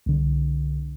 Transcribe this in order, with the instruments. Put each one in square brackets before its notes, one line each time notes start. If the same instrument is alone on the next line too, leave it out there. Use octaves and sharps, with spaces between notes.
[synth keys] C2 D3